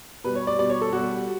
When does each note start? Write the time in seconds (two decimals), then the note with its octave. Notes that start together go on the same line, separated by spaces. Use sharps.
0.24 B2 G3 B4
0.35 C#5
0.47 D5
0.59 B2 G3 D5
0.70 C#5
0.81 A4
0.92 B2 G3 F#4